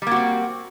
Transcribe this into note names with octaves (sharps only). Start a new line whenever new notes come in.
G3 A#3 C4 F#4